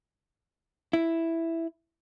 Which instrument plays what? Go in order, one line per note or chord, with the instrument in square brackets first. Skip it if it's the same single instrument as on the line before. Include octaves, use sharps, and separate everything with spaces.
[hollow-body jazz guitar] E4